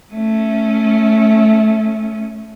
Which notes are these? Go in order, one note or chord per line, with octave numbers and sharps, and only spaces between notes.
A3 C#4